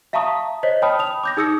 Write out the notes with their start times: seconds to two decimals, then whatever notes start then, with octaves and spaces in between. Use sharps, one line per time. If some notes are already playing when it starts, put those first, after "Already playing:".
0.13 E5 F5 A5 A#5 C#6 D#6
0.63 C5 C#5 D#5 B6
0.82 C#5 G5 A5 B5 D#6 F6
0.99 D#6 F7
1.24 D6 G6 A#6
1.37 D#4 G#4 D#6 E6 A#6 C#7